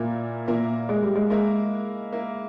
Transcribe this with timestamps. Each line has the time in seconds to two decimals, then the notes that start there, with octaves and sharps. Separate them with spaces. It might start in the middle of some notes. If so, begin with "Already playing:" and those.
Already playing: A#2 A#3 E4 A#4
0.48 A#2 A#3 E4 A#4
0.89 G#3
1.02 G3
1.15 G#3
1.30 G#3 A#3 E4 A#4
2.13 A#3 E4 A#4